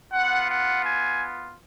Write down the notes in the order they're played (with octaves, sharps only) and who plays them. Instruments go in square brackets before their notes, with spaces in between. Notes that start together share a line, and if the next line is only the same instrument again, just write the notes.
[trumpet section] B3 F4 F#5
F#5
G#5